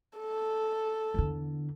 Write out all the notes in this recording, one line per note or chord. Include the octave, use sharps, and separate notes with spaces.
A4
E2 D3